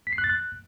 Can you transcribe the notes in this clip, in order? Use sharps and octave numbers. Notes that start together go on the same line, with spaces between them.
B6
C7
F#6
A6
F#6